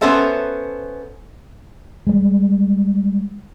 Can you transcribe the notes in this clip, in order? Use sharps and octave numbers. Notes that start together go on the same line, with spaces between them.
B3 C#4 A4 C5 E5 A5
G3 G#3